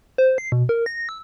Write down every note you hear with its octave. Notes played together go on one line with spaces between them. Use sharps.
C5
C7
B2
A#4
A#6
E6